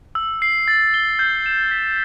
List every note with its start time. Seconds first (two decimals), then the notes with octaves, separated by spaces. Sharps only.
0.15 E6
0.42 C7
0.68 A6
0.94 G7
1.19 G6
1.46 E7
1.71 B6